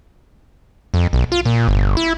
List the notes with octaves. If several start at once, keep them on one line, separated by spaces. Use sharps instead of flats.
F2
B1
F4
A#2
G1
E4